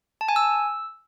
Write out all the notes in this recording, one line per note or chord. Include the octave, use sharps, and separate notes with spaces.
A5
G#5
E6